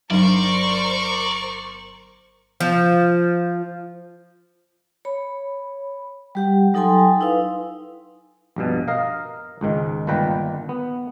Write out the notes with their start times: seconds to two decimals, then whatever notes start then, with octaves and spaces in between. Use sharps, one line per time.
0.11 G1 F#3 D4 D#4 A#4 C5 D5 C#6
2.60 F3
5.05 C#5 B5
6.35 G3 G4 F#5
6.74 F#3 D#4 A4 G5 G#5 C6
7.21 D#4 E4 B4 F5
8.56 A#1 G2 B2
8.88 A#4 D#5 F5
9.61 C#2 G#2 D#3
10.07 G1 A#2 D#3 B4 G5 A#5
10.69 B3